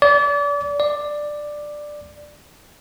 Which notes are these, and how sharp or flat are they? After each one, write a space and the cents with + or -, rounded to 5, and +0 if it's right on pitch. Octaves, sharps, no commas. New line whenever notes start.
D5 -35
D5 +10